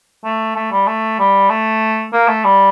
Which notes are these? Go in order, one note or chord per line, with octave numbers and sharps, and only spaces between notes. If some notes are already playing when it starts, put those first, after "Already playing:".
A3
A3
G3
A3
G3
A3
A#3
A3
G3